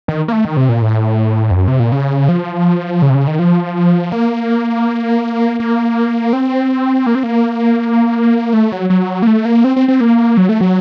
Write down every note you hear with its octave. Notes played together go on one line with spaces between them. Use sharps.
D#3
A#3
A3
D#3
C3
A#2
A2
F2
F#2
C3
A#2
C#3
F3
C#3
C3
C#3
D#3
F3
A#3
A#3
C4
A#3
C4
A#3
A3
F#3
F#3
A#3
A3
A#3
C4
C4
C4
A#3
F#3
A3
F#3